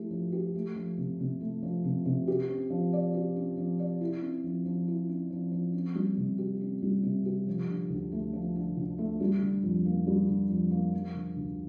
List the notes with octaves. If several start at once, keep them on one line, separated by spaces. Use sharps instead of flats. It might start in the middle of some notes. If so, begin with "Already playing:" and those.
Already playing: F3 A3 E4 G4
F3
G4
A3
F3
C3
C3
A3
F3
C3
C3
G4
C4
F3
D5
G4
C4
F3
D5
E4
C4
F3
F3
E4
C4
F3
F3
C4
G3
C3
G4
C4
G3
C3
G4
F3
D3
D2
A3
F3
D3
D2
A3
G3
D3
F2
A#3
G3
D3
F2
A#3
F3
D3
D2